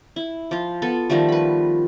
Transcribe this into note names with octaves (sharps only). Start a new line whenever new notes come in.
E4
F3 F4
B3 A4
D#3 F3 G3 A3
B4 B5